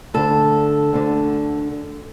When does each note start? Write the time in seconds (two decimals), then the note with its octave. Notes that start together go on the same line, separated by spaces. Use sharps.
0.14 D2 D3 A4
0.93 D2 D3